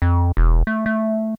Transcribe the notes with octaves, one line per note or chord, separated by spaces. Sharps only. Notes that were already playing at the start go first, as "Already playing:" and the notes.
F2
E1
A3
A3